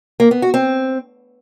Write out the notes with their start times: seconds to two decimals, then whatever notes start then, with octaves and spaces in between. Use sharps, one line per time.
0.20 A#3
0.31 B3
0.42 F#4
0.54 C4